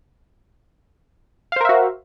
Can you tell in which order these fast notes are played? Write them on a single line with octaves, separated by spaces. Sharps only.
F5 C5 A#4 E5 F#4